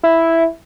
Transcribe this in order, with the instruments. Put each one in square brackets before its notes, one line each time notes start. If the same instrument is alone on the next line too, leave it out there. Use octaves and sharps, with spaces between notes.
[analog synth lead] E4